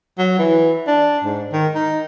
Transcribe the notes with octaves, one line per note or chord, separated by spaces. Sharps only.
F#3
E3
D4
G#2
D#3
D#4